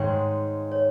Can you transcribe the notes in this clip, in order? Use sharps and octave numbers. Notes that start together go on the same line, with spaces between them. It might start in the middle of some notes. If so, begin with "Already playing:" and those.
Already playing: G#2 D#3 G#3 C#5
C#5